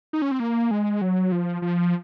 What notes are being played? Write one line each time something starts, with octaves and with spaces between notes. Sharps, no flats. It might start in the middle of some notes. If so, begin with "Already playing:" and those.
D#4
C#4
C4
A#3
G#3
F#3
F3
F3